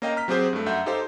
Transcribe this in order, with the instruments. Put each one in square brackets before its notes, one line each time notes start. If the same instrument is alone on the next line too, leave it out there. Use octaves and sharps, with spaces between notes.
[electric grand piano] A#3 C#4 A#4 D#5 F5 G5
A#5 F6 B6
F#3 C4 G4 G#4 C5
G2 A3
F#2 E5 F#5 G6
D#4 G4 A4 C5 F5